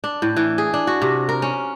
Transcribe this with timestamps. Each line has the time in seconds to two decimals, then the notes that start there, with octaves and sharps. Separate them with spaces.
0.04 D4
0.22 A2
0.36 E3
0.58 G#4
0.74 D4
0.87 F#4
1.02 C3
1.29 A#4
1.42 C#4